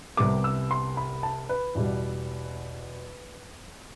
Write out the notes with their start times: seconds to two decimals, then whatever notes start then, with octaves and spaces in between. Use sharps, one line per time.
0.17 C2 C3 G3 B3 D6
0.44 E6
0.71 C6
0.97 B5
1.23 A5
1.49 B4
1.75 E2 B2 G3